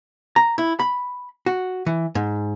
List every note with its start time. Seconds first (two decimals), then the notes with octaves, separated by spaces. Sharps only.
0.36 A#5
0.58 E4
0.79 B5
1.46 F#4
1.86 E3
2.15 G#2